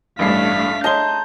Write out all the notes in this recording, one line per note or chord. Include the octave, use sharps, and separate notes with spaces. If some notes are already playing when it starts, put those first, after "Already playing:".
A1 G2 A3 D4 F5 B6 C7
D#5 A5 A#5 C6 G6 G7